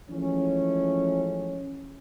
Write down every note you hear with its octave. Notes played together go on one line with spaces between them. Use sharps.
E3 F3 G#3 A3 C#4